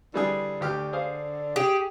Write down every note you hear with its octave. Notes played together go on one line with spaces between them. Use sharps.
D3 E3 G3 G#4
D2 G4 F6
G#4 C5 F5
G4 G#4